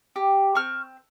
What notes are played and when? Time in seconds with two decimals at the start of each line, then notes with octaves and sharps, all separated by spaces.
0.16 G4
0.55 C4 C#6 F6